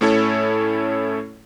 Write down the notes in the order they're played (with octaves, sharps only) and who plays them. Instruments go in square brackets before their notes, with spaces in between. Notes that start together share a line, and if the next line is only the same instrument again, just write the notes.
[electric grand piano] A2 A3 C#4 E4 A4 C#5